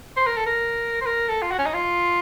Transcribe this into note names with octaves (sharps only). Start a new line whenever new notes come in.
C5
A#4
A4
A#4
C5
A#4
A4
F4
F#4
C#4
D#4
F4